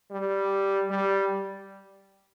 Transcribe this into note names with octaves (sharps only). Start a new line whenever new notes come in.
G3
G3